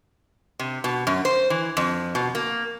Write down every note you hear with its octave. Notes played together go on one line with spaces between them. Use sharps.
C3
B2
F#2
C5
E3
F2
B2
A#3